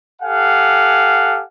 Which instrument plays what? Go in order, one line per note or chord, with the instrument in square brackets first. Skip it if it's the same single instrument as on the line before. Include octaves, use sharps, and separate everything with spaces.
[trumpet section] G4 A4 F5 F#5 G#5